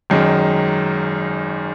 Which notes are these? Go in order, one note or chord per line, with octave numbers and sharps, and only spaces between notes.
G#1 F#2 D#3 G#3